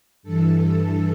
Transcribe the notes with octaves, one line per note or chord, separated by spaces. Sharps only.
G2 E3 A4